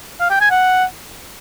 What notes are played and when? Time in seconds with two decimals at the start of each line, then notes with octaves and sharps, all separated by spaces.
0.20 F5
0.30 G5
0.41 G#5
0.51 F#5